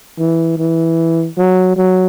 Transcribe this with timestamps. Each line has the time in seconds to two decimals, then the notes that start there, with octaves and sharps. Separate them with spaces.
0.19 E3
0.58 E3
1.37 F#3
1.77 F#3